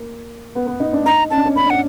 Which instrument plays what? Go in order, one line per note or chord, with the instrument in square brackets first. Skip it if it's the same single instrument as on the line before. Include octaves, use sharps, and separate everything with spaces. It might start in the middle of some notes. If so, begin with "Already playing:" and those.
Already playing: [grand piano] A#3
B3
B3
D#4
D4
[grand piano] D#4 [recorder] A#5
[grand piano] C#4 [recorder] A5
[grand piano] D4
C#4
[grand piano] C#4 [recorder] B5
[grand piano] D4
[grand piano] C#4 [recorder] F#5